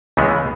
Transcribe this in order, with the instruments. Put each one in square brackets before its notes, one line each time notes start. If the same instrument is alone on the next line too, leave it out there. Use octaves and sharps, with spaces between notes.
[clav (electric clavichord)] C#2 C#3 E3 G#3 B3